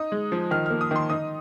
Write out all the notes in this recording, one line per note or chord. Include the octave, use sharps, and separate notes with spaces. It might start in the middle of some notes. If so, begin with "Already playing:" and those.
Already playing: D#4 D#6
G#3
F3
D#3 F6
A#3 F6
D#6
D#3 C6
D#4 D#6